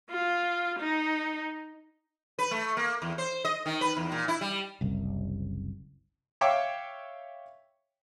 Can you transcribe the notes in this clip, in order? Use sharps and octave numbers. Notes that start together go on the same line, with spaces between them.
F4
D#4
B4
A3
A#3
E2
C5
D#5
D#3
B4
E2
A#2
E4
G3
F#1 C2
C#5 E5 F5 G5 C#6 D6